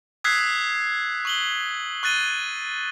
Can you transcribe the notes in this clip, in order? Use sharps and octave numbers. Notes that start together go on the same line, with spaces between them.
D#6 E6 F#6 G#6 B6 C7
C#6 F#7 G7
C#6 F#6 A6 D#7 G7